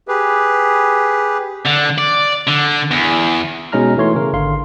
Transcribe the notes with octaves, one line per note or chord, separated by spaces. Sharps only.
G4 G#4 B4
D3
D5
D3
E2
B2 G#3 C#4 D#4 A#5 F6
E3 A3 C#5 C6
C#3 A#4
G#1 D3 F5 C6